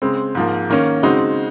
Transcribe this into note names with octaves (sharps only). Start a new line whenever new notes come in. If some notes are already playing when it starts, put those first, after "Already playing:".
C#3 G#3 C4
G#2 F3 A#3
D#3 A#3 C#4
C#3 G#3 C4 D#4 F#4